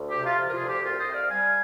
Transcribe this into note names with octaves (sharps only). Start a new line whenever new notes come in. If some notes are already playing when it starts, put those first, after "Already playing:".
Already playing: D2
G4
C3
F4
F3
A#4
F4 G#4
D2
G4
C2 F4
C5 D#5
C3
D5 F5
G3 F5 G#5